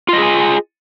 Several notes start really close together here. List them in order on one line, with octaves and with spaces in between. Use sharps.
F4 D#5 G#4 G#5